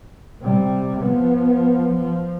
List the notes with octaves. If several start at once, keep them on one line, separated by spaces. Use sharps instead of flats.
C3 G3
F3 B3
F3